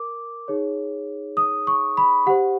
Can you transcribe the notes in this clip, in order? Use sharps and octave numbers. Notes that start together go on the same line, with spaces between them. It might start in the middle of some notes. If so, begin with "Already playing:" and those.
Already playing: A#4 D6
D#4 G#4 C#5
D#6
C#6
B5
G4 C5 F#5